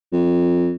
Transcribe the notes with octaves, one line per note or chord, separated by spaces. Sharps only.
F2